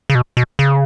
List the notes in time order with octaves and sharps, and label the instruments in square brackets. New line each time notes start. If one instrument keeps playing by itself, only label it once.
[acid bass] C#3
B2
B2
C#3